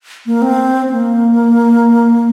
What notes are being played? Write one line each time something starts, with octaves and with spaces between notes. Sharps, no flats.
A#3
C4
C4
A#3